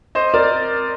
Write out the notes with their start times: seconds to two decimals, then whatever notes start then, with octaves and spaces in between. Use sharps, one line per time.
0.15 C5 D#5
0.34 A#4 D5